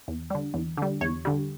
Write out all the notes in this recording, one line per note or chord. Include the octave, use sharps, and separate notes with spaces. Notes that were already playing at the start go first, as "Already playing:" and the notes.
E2
D3 G3
E2
D3 G3
E2 C#5
D3 G3